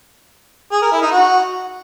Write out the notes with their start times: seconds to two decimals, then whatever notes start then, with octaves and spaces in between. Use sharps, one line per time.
0.72 G#4
0.82 A#4
0.92 E4
1.02 D#4
1.12 F#4